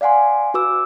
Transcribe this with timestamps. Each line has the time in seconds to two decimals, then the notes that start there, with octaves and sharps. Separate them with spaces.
0.01 D5 F5 F#5 G#5 C6
0.54 F#4 B4 D6 E6